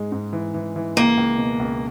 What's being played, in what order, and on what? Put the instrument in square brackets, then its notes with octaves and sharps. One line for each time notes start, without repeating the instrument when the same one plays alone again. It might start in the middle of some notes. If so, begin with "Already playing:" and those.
Already playing: [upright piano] G#2 G#3
G#2
E3
E3
E3
[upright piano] C#2 [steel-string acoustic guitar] A#3
[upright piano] C#2
B2
C#2